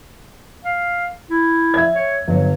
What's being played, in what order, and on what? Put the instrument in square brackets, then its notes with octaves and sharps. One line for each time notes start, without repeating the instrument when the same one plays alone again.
[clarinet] F5
E4
[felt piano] E5 G#6
[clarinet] C#5
[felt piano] G1 [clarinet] F#3